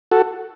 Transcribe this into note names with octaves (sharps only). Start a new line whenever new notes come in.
F#4 A4